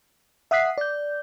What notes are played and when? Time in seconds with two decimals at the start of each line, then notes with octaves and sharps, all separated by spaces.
0.51 E5 F#5 D#6 F#6 B6 C7
0.78 D5 G6